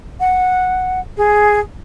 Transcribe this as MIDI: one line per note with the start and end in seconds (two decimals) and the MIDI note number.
0.20 1.00 78
1.17 1.60 68